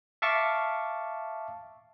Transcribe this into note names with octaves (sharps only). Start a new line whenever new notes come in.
E5 F5 A5 C#6 D6